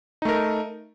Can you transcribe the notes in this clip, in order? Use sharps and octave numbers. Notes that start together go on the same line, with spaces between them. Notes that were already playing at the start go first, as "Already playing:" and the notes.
A3 D#4 A#4